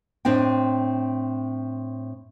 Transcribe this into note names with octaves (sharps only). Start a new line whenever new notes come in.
A2 C4 D4 D#5 G5